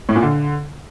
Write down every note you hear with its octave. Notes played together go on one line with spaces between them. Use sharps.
A2
A#2
D3